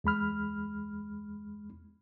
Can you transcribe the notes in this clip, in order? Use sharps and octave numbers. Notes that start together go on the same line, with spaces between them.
E2 G#3 B5 F6